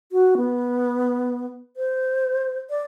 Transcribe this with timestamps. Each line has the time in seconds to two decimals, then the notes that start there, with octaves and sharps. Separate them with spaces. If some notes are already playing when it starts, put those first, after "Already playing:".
0.12 F#4
0.37 B3
1.77 C5
2.70 D5